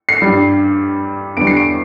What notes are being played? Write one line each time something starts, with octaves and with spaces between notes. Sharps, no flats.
C7
G3
G2
E2 D3 G3 D7
C7
D7